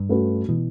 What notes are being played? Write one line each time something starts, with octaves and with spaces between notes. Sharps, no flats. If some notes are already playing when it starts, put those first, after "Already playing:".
Already playing: G2
A3 C#4 F#4 B4
B2 E3